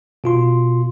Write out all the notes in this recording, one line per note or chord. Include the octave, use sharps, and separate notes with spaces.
B2 F4 C6